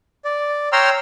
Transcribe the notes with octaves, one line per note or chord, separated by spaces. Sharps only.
D5
C#5 G5 A#5 C6 E6 F6